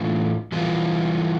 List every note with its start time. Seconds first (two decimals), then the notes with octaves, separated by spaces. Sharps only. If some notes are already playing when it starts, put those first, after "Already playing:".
Already playing: A2 E3 A3 D4 F4
0.52 E3 G3 B3 F4